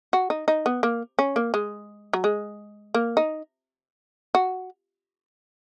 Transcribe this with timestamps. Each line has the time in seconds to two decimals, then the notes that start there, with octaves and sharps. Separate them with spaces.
0.13 F#4
0.30 D#4
0.48 D#4
0.66 B3
0.83 A#3
1.19 C#4
1.36 A#3
1.54 G#3
2.13 F#3
2.24 G#3
2.95 A#3
3.17 D#4
4.35 F#4